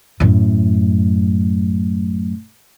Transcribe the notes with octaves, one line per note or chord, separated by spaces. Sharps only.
F#2 A2